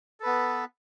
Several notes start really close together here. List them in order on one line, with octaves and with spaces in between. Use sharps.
A4 B4 B3